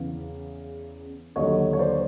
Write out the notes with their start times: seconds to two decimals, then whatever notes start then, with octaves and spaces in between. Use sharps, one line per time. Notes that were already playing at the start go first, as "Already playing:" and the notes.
Already playing: E2 C#3 E3 F5
1.36 D#2 D3 F#3 C#5 D#5
1.73 C#5
1.79 C5 D5